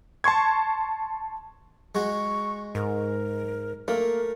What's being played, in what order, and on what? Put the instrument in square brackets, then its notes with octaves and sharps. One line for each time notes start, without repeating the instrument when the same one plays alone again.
[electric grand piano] A5 C6 C#6 G#6
[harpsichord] G#3 F#4 [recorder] C#6
[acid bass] G#2 [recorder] A#4
[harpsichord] A3 [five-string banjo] A#3 [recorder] A#4